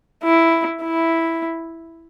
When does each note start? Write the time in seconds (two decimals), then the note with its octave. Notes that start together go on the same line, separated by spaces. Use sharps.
0.24 E4
0.82 E4